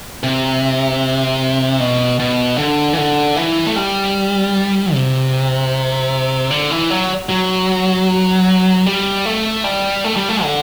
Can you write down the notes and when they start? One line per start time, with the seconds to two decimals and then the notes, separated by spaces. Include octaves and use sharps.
0.23 C3
1.80 B2
2.20 B2
2.58 D3
2.93 E3
2.98 D3
3.36 E3
3.67 A3
3.76 G3
4.94 C3
6.51 D3
6.70 E3
6.90 F#3
7.29 F#3
8.86 G3
9.25 A3
9.64 G3
10.04 A3
10.16 G3
10.29 A3
10.43 D3